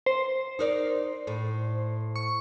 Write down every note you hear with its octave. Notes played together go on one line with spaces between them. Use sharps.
C5
D#4 A#4 D5
A2
C#6